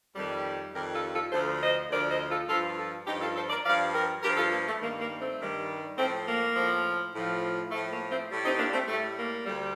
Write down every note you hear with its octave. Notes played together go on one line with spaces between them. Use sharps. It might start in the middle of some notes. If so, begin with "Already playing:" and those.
F2 D#3 G3
F2 D#3 G3 G4 A#4
F4 A4
F4 A4
D2 D3 F3 A4 C5
C5 D#5
D2 D3 F3 A#4 D5
C5 D#5
F4 A4
G2 F3 F4 A4
F4 A4
G2 F3 D#4 G4
F4 A4
A4 C5
A#4 D5
G2 F3 D5 F5
G4 A#4
G2 G4 A#4
F3
F4 A4
A#3
A3
G2 D#3 G3 A#3
A#3
A3 C4
G2 D#3 G3
A2 F3 A3 C4
A#3
A2 F3
A2 F3
A2 F3 A3
A#3
A3 C4
A2 G3
C4 D#4
A#3 D4
A3 C4
A2 G3 A3
A#3
D2 D3 G3